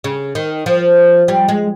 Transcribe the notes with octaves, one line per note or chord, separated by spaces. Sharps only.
C#3
D#3
F3
G3
G#3